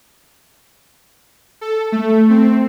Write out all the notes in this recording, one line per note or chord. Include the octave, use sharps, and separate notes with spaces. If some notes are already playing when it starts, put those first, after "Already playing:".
A4
A3
C4